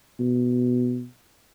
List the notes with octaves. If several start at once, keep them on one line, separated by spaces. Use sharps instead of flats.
B2